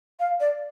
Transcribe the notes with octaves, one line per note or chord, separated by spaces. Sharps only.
F5
D5